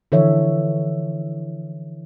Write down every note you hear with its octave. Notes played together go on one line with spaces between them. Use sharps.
D3 E3 F3 A4 C#5 E5